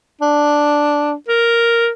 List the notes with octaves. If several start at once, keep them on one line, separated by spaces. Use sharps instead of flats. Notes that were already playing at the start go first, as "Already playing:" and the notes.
D4
A#4